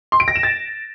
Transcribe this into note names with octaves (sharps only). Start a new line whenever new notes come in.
C6
D7
A#6
E7
A6